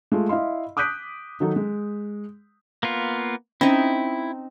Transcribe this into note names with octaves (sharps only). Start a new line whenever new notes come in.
G#3 A3 F4
E4 D#5 F5 C6
D6 D#6 F#6 G6 B6 D7
D#3 F#3 D#4 A4
G#3
A#3 B3 F4
C4 C#4 D#4 E4